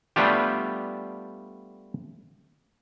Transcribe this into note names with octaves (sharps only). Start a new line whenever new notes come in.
G3 A3 B3 D4 F4 G4